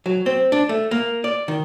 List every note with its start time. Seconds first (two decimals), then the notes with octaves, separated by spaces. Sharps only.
0.06 F#3
0.26 C4
0.52 D4
0.69 A3
0.91 A#3
1.24 D5
1.48 D#3